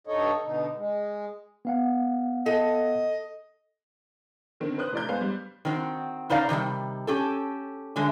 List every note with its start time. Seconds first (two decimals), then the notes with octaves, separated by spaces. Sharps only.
0.07 G2 D#4 A4 C#5 D#5
0.43 B2 D3 D#4
0.76 G#3
1.65 B3 F5 F#5
2.46 A4 D#5
4.60 D3 D#3 C4
4.78 B4 C5 D#6 F#6
4.93 F1 E4 D5 A#5 G6
5.08 G#3 B3 C5 F5
5.21 G3
5.65 D#3 C4 F#4
6.30 C#3 D#4 C5 D5 F5 A#5
6.49 C3 D#3 F3 G3
7.07 C#4 G4 A4
7.96 D3 F#3 G#3 A3